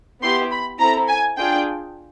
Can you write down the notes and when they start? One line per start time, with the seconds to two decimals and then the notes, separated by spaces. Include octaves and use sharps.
0.23 B3 E4 G4 C6
0.52 B5
0.80 C4 E4 A4 A#5
1.09 G#5
1.37 D4 F4 G#4 G5